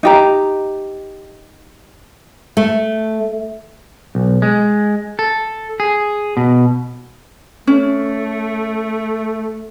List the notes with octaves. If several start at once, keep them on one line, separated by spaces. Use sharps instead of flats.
D#4 G4 A#5
A3
B1
G#3
A4
G#4
B2
A3 C#4